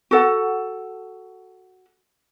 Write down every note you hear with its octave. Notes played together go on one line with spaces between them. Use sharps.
F#4 A4 F#5